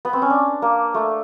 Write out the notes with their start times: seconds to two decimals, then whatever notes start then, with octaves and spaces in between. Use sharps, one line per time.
0.05 B3
0.13 C4
0.22 C#4
0.30 D4
0.62 A#3
0.94 A3